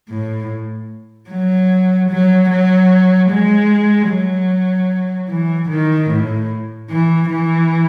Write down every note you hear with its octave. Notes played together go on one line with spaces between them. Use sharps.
A2
F#3
F#3
F#3
G#3
F#3
E3
D#3
A2
E3
E3